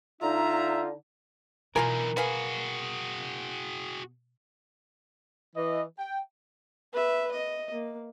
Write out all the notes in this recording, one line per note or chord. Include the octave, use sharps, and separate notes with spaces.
D3 D#4 F4 E5 A#5
B2 E3 A#3 D#4 F4 A#4 G#5
F#4 G#4 B4 F5 G#5
E3 D#5
G5
B4 E5
D#5
A#3